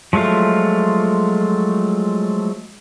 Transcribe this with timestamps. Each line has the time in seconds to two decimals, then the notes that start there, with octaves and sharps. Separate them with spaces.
0.13 F3 F#3 G#3 A3 F4